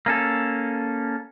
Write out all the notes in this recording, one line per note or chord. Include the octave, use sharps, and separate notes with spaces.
A#3 C#4 A4